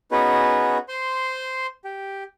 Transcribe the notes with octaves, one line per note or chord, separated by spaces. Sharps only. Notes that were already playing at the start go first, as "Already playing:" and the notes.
B3 C#4 D#4 F#4 G#4 B4
C5 C6
G4